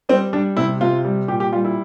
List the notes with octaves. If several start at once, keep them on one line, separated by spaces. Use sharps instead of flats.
G3 C4
G3 D4
C3 E4
C3 F4
G3
A#2 G4
G4
G3 F4
E4